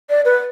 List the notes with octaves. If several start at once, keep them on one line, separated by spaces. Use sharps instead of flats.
D5
B4